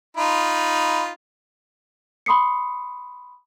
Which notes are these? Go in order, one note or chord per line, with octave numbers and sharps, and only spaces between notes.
D#4 F4 B5
B5 C6 D#6 C7 C#7